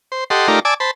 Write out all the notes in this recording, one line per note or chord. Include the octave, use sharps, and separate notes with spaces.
C5
G4 A4 D#5 F#5 C6
A3 D#4 F4 G4 A#4 D5
D5 G#5 A5 D6 E6
C5 A5 B5